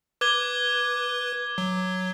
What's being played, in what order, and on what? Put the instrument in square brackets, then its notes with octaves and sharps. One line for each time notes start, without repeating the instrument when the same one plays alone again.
[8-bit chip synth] B4 [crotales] D6 G#6 G7
[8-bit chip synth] F#3